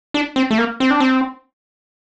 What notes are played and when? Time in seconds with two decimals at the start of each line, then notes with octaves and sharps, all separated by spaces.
0.14 D4
0.36 C4
0.51 A3
0.58 A#3
0.80 C4
0.91 D4
1.00 C4